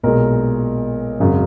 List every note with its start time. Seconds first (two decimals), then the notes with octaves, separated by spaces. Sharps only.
0.03 B1 A#2 G#3 A#4
1.19 G#1 F#2 C#3